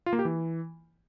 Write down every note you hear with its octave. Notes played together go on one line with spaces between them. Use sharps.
F4
A#3
G4
E3